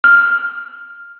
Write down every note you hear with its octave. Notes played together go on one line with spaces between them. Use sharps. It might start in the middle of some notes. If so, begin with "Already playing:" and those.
F6